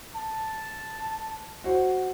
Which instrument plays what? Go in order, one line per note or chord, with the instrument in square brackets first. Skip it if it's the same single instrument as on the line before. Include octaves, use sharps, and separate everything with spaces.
[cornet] A5
[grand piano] F#4 C5